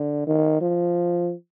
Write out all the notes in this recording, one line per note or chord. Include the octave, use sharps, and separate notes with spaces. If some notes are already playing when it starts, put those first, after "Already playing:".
Already playing: D3
D#3
F3